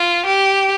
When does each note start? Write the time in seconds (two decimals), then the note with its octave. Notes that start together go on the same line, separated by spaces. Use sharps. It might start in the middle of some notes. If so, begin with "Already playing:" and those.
Already playing: F4
0.26 G4